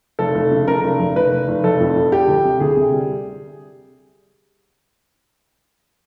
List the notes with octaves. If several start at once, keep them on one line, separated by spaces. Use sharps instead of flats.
F1 A4
F1
C#3
C#3 A#4
F1
F1
F1 B4
F1
F1
F1 A4
F2
F2
G3 G4
D2
C3
D2 G#4
C3
G3